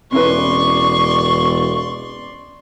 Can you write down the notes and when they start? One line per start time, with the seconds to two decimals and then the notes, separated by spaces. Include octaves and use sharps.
0.12 E1 C#4 E4 B4 D5 C6 C#6